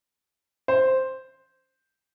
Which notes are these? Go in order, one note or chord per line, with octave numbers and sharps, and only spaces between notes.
C5